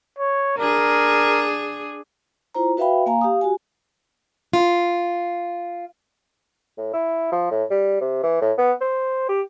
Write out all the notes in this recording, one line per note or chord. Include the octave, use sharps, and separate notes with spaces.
C#5
D4 G#4 A#4
E4 F4 C5 A#5
F#4 B4 E5 F5 G5 B5
A#3 F5 G#5 A#5
G4 F5 D#6
F#4 G4 G#5
F4
A2
E4
F3
A2
G3
C3
E3
A2
B3
C5
G4